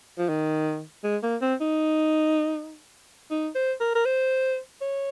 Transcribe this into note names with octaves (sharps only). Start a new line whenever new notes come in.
F3
D#3
G#3
A#3
C4
D#4
D#4
C5
A#4
A#4
C5
C#5